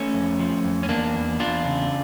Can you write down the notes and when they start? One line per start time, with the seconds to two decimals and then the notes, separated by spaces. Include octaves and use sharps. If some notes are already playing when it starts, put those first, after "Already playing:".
Already playing: A3 C#4
0.14 F2
0.39 F3
0.65 F2
0.83 C#4
0.89 E2 A#3 D4
1.14 E2
1.40 E2 D4 F4
1.65 C#3